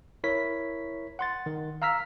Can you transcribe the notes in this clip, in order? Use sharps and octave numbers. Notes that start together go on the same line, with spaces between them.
E4 A#4 C#5 B6
F#5 C6 A6
D#3
F5 A#5 E6 F6 B6